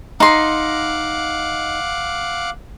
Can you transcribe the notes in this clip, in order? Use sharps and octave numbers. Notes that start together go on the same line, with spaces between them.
D#4 F5 F#5 C6 D6